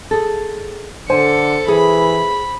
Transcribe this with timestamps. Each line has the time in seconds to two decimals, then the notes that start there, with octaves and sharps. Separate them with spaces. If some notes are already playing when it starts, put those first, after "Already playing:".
0.11 G#4 A4
1.10 D3 A4 C5 G#5 C#7
1.68 E3 G#4 B5